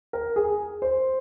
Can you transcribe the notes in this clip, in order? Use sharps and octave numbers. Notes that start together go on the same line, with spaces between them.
A#4
G#4
C5